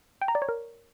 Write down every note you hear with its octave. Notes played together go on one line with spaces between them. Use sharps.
G5
A#5
D5
C#5
A#4